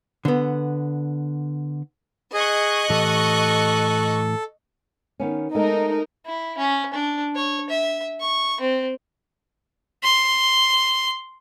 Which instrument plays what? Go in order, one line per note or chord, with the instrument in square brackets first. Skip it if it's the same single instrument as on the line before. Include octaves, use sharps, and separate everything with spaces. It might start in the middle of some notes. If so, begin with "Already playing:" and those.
[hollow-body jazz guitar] D3 B3
[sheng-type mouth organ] G#4 [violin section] D#5 C#6 F#6
[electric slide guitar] A2 E3 G4 [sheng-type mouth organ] A4
[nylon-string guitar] D#3 B3 C#4
[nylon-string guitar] G#3 A3 A4 [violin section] D#4 A#4
[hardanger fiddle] E4
C#4
D4
C#5
E5
C#6
C4
[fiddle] C6